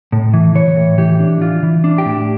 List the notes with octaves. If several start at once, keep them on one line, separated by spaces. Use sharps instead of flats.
A2
E3
E3 C#5
A2
E3 G4
D4
E3 F4
E3
D4
G4
A2